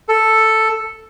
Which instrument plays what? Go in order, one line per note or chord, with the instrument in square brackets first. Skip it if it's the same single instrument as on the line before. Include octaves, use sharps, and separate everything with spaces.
[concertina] A4